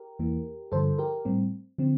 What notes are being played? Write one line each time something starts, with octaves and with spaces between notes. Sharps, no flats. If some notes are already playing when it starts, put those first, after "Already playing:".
Already playing: G4 A#4
E2 E3 A#3
G2 D3 F3 A4 C5
G4 A#4
A2 G3 C4
D3 F3 C4